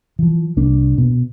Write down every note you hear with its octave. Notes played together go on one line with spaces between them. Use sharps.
E3 F3
C2 A#3 D4
B2